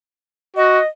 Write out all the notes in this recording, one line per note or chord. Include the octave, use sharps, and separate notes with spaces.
F#4 D#5